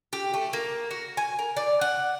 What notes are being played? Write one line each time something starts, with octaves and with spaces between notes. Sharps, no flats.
G4
A3
A#3
F#4
G#5
A#4
D5
F#5